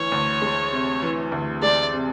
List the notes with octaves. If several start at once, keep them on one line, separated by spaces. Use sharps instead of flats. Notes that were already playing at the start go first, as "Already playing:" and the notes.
Already playing: D2 E3 C#5
D2
G#3
C3
E3
D2
G#3 D5
C3